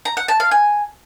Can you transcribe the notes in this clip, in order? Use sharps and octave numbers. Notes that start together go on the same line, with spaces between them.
A#5
F#5
A5
F5
G#5